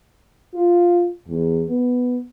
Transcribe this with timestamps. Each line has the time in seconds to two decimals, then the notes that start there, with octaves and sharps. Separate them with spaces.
0.54 F4
1.28 E2
1.68 B3